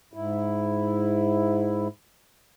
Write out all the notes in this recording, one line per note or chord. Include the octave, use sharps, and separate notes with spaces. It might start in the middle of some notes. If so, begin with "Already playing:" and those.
G#2 E4